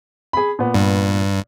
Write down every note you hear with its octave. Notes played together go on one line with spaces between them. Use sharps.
G#4 B5
A#2 B3
G2